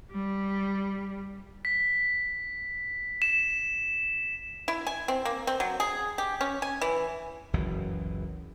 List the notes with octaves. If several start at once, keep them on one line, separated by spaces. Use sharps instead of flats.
G3
B6
E7
E4
G#5
C4
A#3
C4
F#3
G#4
G4
C#4
G#5
E3
F#1 C#2 F#2 E3